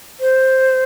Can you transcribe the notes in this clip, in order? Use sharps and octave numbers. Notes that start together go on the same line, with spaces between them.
C5